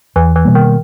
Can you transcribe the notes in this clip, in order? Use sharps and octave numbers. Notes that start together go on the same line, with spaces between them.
E2 E3
E3
B2 G3 A#3
D#3